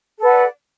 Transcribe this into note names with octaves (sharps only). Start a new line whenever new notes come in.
A4 B4 D5 F#5